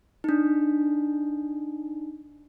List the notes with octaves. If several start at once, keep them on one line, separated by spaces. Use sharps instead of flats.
D4 D#4